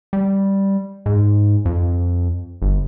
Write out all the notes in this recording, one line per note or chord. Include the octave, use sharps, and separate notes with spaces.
G3
G#2
F2
G1